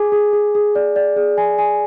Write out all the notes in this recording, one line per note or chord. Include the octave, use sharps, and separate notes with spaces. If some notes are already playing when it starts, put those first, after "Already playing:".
Already playing: G#4 G#5 D6
G#4
G#4
G#4
D5
D5
G#4
G#5
G#5